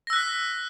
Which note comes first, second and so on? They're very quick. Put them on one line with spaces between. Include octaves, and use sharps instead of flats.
A#6 E6 F#6 B6